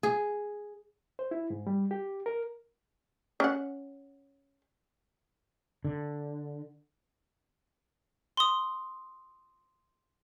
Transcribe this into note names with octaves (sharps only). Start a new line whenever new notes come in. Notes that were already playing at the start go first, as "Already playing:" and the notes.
G#4
C5
E4
G#2
G3
G4
A#4
C#4 F#5
D3
C6 D#6